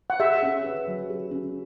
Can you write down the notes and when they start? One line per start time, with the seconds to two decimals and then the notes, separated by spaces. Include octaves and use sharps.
0.10 F#5
0.20 G#4 E5
0.42 C#4
0.64 B4
0.87 F#3
1.10 G#4
1.31 C#4